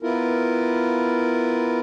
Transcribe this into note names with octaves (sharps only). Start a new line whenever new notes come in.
B3 E4 F4 A#4